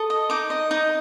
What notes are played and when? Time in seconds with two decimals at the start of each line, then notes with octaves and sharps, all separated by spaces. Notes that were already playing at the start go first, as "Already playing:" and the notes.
Already playing: A4 D#6
0.10 D#5
0.30 D#4 D6
0.50 D#5
0.71 D#4